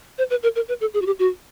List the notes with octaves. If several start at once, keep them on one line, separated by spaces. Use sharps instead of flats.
C5
B4
A#4
A#4
B4
A4
G#4
F#4
G4
F#4